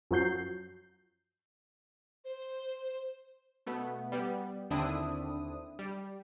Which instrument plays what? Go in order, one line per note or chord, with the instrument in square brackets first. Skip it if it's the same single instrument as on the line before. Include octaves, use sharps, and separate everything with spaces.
[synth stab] F#2 F3 F#3 G6 C7
[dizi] C5
[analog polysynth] B2 A3 B3
G3 B3
D#2 D3 C4 D4 E4 D#6
G3